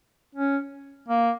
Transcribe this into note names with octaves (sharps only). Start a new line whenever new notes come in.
C#4
A#3